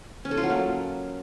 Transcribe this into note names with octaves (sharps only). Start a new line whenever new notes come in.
C#4
A4
F4
F#3
A#3